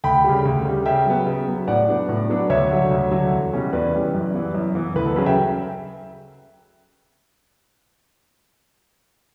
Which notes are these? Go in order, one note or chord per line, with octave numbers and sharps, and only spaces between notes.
D2 G5 B5
C#3 G3
D2
C#3 G3
C#3 E5 G5
F#3 B3
C#3
F#3 B3
A2 D5 F#5
F#3 B3 D4
A2
F#3 B3 D4
D2 C#5 E5
D3 F#3
D2
D3 F#3
E2
B2 G3 C#4 E4
E2 B4 D5
B2 G3 C#4 E4
F#2
E3 B3
F#2
E3 B3
D2 B4
A4
C#3 F#3 C#4 B4
E5 G5